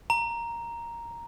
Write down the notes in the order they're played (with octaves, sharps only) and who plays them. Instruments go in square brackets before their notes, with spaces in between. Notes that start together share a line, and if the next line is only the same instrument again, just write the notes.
[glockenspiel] A#5